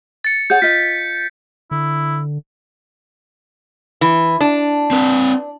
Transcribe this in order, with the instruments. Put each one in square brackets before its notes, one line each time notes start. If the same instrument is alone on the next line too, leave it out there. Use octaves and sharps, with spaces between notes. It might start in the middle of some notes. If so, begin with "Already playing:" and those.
[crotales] A6 C#7
[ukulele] G#4 C#5 F#5 [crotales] G6
[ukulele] F4 D#5 [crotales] B6
[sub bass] D3 [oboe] E4
[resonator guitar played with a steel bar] E3
D4
[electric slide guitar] C4 B4